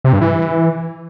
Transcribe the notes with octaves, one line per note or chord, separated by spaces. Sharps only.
C3
G2
E3